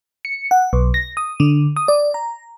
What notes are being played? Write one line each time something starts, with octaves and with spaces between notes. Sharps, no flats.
C#7
F#5
B1
A#6
D#6
D3
D#6
D5
A#5